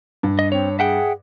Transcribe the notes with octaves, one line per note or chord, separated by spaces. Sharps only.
G2
D#5
C4 C#5
G#4 E5 F#5 G5